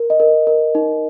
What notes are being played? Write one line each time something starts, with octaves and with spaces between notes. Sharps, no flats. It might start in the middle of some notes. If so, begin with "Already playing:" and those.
Already playing: A#4
D#5
A#4
A#4
D#4